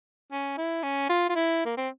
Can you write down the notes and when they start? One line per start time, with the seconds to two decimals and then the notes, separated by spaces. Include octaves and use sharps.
0.32 C#4
0.58 E4
0.83 C#4
1.10 F4
1.30 F4
1.36 E4
1.65 A#3
1.77 C4